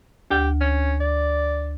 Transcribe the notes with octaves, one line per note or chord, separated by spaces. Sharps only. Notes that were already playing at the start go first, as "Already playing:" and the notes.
D2 G4
C#4
D5